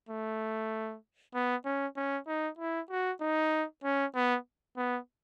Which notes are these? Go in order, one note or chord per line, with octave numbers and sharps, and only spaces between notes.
A3
B3
C#4
C#4
D#4
E4
F#4
D#4
C#4
B3
B3